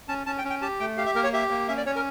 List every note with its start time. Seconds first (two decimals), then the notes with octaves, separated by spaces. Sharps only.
0.08 C#4 A5
0.26 C#4 A5
0.38 G5
0.44 C#4
0.50 G5
0.62 G4 A5
0.80 A3 G5
0.97 G4 F5
1.06 E5
1.15 A#3 A#4
1.24 C#5
1.33 G4 E5
1.50 A#3
1.68 C#4 E5
1.77 D5
1.86 C#4 C#5
1.96 A#4